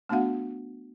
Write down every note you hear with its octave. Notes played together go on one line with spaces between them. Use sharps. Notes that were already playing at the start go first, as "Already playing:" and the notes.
A3 B3 D4 F#4 F5 F#5